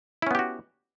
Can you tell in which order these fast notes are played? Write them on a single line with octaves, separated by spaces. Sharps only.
E4 C#4 B3 G4 F#4